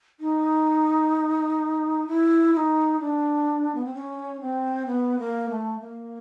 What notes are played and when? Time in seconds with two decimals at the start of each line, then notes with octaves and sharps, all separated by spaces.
0.20 D#4
2.07 E4
2.53 E4
2.57 D#4
3.00 D4
3.75 B3
3.85 C4
3.94 C#4
4.41 C4
4.87 B3
5.19 A#3
5.50 A3
5.80 A#3